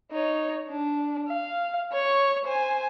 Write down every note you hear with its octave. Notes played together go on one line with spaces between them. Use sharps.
D#4 C#5
D4
F5
C#5 C#6
C5 G#5